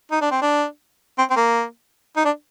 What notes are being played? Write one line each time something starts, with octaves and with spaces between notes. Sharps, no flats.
D#4
D4
C4
D4
C4
C4
A#3
D#4
D4